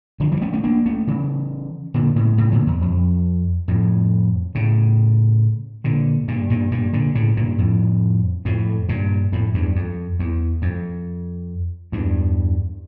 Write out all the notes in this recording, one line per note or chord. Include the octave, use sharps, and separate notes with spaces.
D3 F3
E3 G3
A3 C#4
A3 C#4
A#3 D4
A3 C#4
C#3 E3
A#2 D3
A2 C#3
A2 C#3
A#2 D3
E2
F2
F2 A2
A2 C#3
A#2 D3
G2 A#2
G2 A#2
G2 A#2
A#2 D3
A2 C#3
G2 A#2
F2 A2
F2 A2
G2 A#2
F2 A2
E2 G2
F2
E2
F2
E2 G2